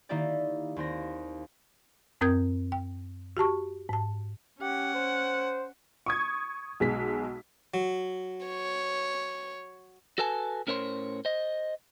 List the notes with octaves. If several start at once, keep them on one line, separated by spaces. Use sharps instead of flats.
D#3 A#3 D#4 E4 G4 D5
D#2 C4 A#6
F#2 C4 A#4 D#6 G6 G#6
G5
F#4 G4 A5 C#6
G#2 A5
C#4 G4 F#5
C5
C#6 D#6 G#6
B1 G#3 B6
F#3
C#5
F#4 A4 B4 G#5 A5
A2 C#4 A#4 C5 C#5 C6
C5 D#5